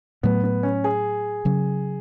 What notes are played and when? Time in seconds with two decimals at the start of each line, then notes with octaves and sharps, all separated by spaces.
0.23 A2 F#3 A3 B3
0.44 B3
0.63 C#4
0.84 G#4
1.45 C#3 F#3 C#4